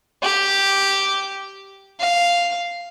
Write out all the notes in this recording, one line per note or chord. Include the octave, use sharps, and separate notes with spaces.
G4
F5